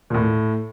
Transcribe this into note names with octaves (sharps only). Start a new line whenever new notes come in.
A#2
A2